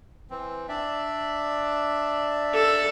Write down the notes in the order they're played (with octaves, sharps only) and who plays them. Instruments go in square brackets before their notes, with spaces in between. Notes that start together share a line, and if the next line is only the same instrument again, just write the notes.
[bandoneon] E3 C4
D4 D5 E5
[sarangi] A4